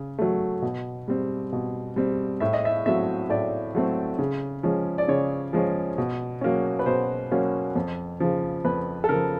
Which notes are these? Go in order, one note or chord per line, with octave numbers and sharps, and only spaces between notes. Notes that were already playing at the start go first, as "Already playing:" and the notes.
Already playing: C#3
F#3 A3
B2
G3 C4
B2
G3 C4
A2 E5
D#5
E5
F#3 A3 C4 E5
A2 D5
F#3 A3 C4
C#3
F3 G#3 C#4
D5
C#3 C#5
F3 G#3 C#4
B2
F#3 A#3 C#4
B4
B2 C5
F#3 A#3 C#4
F2
C#3 F3
F2 B4
A4
C#3 F3 A#4